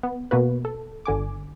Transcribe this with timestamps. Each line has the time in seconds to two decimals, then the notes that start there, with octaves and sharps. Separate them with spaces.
0.03 B3
0.31 B2 A#3 F#4 B4
0.65 A4
1.06 G1 D3 G#5 D6